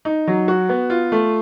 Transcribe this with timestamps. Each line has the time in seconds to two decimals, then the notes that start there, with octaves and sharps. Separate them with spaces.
0.05 D#4
0.27 F#3
0.48 F#4
0.69 B3
0.90 F4
1.12 A3